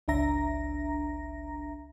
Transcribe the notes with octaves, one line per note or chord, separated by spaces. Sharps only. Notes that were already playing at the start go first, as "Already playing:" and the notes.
G1 C#2 D4 E5 A#5 A#6